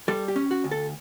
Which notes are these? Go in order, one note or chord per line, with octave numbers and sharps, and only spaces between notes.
G3 A4
G4
C#4
F#4
D2
A4